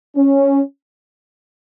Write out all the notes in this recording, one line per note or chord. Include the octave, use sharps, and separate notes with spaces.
C#4